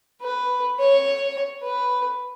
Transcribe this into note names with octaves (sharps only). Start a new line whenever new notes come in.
B4
C#5
B4